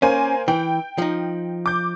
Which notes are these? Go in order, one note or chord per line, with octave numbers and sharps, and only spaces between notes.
A#3 C#4 C5 G#5
E3 G5
F3 D#4
D6 G6